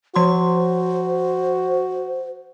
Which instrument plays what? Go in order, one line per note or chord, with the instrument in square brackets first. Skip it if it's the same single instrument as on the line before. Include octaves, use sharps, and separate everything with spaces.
[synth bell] F3 C6 [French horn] F#4 [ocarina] C5